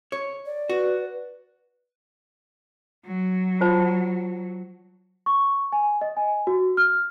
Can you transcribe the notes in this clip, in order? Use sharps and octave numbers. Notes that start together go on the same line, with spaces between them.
C#5
D5
F#4 B4
F#3
F4 C5 A5
C#6
G#5
D#5
G#5
F#4
F6